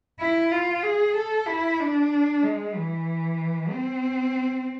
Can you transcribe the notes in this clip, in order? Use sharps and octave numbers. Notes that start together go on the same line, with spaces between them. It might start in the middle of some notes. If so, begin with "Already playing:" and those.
E4
F4
G#4
A4
E4
D4
G#3
E3
C4